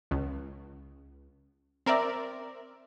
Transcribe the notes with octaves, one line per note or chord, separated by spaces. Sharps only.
C#2
C4 A#4 D5 E5